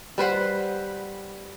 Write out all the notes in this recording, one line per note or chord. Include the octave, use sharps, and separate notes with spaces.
G3 B4 C5 F#5